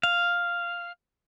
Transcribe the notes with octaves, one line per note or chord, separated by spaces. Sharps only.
F5